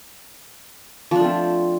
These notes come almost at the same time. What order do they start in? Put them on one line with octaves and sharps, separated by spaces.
F3 D4 A3 C4